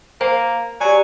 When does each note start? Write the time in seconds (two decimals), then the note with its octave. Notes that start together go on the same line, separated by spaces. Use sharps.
0.21 A#3 C5
0.81 F#3 G4 D5 G#5